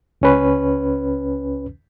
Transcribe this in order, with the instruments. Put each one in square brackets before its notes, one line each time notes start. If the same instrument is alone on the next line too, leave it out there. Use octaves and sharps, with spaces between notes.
[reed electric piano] C#2 C#4 B4